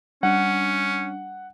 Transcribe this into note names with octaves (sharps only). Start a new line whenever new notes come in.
G3 C#4 D4 F#5